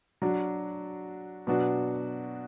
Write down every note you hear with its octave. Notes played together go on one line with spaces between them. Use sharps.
F#3 D4 F#4
B2 F#3 D4 F#4